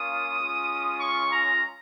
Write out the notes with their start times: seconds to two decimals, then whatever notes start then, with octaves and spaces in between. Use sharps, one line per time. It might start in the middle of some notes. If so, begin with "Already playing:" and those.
Already playing: A#3 C#4 F4 D#6
0.40 G#3 C#4 F4
1.01 C#6
1.31 A#5